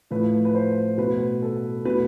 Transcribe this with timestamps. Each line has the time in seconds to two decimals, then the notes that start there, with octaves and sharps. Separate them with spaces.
0.11 A2 F3 A3 B4
0.45 B4
0.55 C5
0.98 B2 A3 B4
1.42 A4
1.85 B2 A3 B4